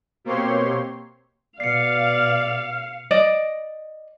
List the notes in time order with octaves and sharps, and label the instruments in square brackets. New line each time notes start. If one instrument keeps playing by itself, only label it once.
[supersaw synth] B2 A#3 C4 G4 C#5 C6
[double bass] B2 [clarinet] D5 [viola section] F5 [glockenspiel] C7 C#7
[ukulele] D5 D#5